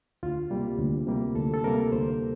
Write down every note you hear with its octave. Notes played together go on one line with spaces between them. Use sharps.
D2 F4
C3 G3 A#3
D2
C3 G3 A#3
D2 A4
A4
C3 G3 A#3 A#4
D2 C5